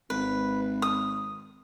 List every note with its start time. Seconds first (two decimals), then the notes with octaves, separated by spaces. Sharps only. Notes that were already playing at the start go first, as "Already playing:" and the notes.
0.10 G#1 B4
0.82 D#6